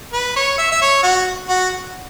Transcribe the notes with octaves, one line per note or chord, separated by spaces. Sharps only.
B4
C#5
E5
E5
C#5
F#4
F#4